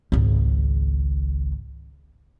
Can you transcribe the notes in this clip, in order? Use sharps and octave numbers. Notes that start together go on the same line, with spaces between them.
G#1 C#2